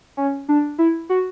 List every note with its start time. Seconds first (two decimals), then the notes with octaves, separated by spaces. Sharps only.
0.17 C#4
0.49 D4
0.79 E4
1.09 F#4